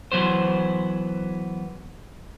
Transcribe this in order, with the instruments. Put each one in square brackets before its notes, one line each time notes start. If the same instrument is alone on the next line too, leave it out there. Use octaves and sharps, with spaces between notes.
[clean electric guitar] E3 F#3 B3 C5